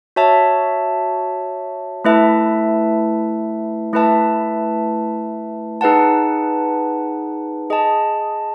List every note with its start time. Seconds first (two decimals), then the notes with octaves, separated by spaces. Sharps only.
0.16 F#4 C#5 E5 A5
2.05 A3 E4 B4 E5 A5
3.93 A3 E4 B4 E5 A5
5.81 D#4 G#4 B4 F#5 A5
7.70 G#4 D#5 A5